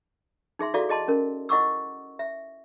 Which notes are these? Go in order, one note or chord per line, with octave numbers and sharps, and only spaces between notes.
D#4 G#4 E5 C6
E4 F#4 G#4 A4 D5 F5
G#4 D#5 A5 C6
C#4 A#4
E4 D#5 F#5 C#6 D6 E6
E5